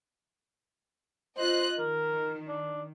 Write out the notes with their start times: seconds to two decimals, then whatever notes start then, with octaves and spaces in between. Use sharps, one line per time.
1.37 F4 C5 D#5 F#6
1.79 D#3 A#4
2.48 D4